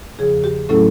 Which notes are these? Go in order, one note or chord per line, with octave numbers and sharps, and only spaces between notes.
E2 C#3 F3 G#4
G4
A2 F#3 A3 C#4 E4 A4